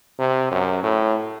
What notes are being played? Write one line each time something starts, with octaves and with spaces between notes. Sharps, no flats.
C3
F#2
A2